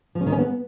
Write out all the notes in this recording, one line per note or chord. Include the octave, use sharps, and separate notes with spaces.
F3
C#4
D#3
C#4
B3